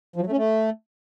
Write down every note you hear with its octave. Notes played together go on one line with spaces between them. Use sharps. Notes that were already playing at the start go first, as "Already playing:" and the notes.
F3
F#3
A3
C#4
A3